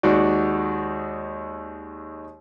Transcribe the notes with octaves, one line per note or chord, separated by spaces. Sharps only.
D#2 G#3 D#4 F#4 D5